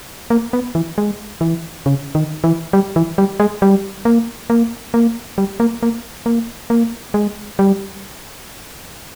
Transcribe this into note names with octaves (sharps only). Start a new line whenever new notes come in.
A#3
B3
E3
G#3
E3
C#3
D#3
E3
G3
E3
G3
G#3
G3
A#3
A#3
A#3
G3
A#3
A#3
A#3
A#3
G#3
G3